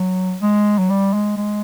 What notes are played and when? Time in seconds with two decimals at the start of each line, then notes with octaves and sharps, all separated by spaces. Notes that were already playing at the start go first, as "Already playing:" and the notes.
Already playing: F#3
0.42 G#3
0.78 F#3
0.90 G3
1.14 G#3
1.37 G#3